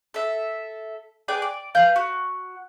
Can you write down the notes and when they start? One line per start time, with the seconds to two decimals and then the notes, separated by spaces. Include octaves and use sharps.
0.14 A4 E5
1.28 G#4 B4 D5 G5
1.42 D5
1.75 B4 F5 G6
1.96 F#4